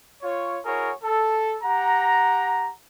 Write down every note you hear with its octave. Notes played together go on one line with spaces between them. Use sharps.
F4 C#5
E4 F#4 G#4 A#4 C#5
A4
G4 F#5 A#5